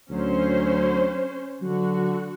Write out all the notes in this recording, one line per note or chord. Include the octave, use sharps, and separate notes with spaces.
D2 F#3 C#4 C5
D3 F#3 F#4